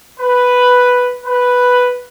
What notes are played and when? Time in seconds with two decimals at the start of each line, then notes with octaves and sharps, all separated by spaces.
0.19 B4
1.24 B4